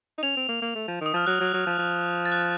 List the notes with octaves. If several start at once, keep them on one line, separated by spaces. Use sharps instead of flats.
D#4
C#4 F7
C4
A#3
A#3
A3
F3
D#3
D#6
F3 F6
F#3 F#6
F#3
F#3
F3
F3
A6
F#6